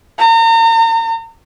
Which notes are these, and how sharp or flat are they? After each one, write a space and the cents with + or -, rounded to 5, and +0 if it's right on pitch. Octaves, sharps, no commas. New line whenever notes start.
A#5 -40